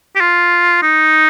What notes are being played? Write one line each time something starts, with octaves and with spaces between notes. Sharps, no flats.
G4
F4
D#4